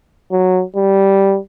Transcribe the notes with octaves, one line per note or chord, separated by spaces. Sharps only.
F#3
G3